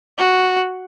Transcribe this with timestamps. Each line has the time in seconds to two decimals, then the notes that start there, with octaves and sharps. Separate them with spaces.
0.18 F#4